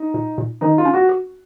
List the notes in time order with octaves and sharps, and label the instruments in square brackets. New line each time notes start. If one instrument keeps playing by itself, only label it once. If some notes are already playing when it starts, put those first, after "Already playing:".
Already playing: [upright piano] D#4
[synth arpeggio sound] A#2
A#2
[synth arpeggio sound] D#3 [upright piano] D#4
[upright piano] F4
[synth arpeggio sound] C#4
[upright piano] F#4
[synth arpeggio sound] F#4